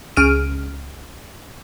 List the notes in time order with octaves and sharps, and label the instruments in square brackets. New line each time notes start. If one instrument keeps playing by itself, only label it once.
[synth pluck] C#2 F6 D7 D#7